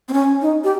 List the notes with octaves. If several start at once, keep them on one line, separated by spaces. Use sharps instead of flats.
C4
C#4
D#4
G4